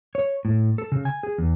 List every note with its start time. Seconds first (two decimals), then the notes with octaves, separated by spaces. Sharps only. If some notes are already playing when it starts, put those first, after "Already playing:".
0.15 C#5
0.45 A2
0.78 A4
0.92 C#3
1.05 G#5
1.23 G#4
1.38 E2